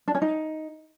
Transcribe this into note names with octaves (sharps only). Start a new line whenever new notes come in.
D4
C#4
D#4